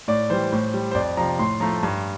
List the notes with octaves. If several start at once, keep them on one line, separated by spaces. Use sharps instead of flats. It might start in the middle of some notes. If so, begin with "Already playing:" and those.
A2 D5
E3 G3 C5
A2
G3
C5
F2 D5
C3 F3 A#5
A2 C6
F3 A3 A#5
G2